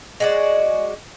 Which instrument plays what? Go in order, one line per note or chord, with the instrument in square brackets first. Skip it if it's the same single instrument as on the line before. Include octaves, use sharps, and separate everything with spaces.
[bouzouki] G#3 F#4 D5 [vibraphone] D#5